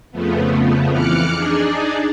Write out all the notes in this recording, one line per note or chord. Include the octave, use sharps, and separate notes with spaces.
F2 C#3 F3 A3 B3
F2 E3 D6 F6 F#6 C#7
D4 D#4 G#4 D5